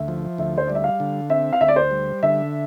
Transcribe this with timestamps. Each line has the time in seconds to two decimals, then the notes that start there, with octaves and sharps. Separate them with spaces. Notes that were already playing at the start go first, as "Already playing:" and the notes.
Already playing: D2 E5
0.08 F3
0.38 D2 E5
0.58 C5
0.67 G3 D5
0.75 E5
0.84 F5
1.00 D3
1.30 C4 E5
1.53 F5
1.61 D2 E5
1.68 D5
1.76 C5
1.91 G3
2.23 D3 E5